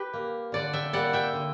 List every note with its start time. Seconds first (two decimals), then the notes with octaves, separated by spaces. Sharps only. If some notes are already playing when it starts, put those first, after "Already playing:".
Already playing: G4 B4
0.13 A#3
0.52 D3 D5 F#5
0.73 E5 G5
0.93 G3 A#3 D5 F#5
1.13 E5 G5
1.33 D3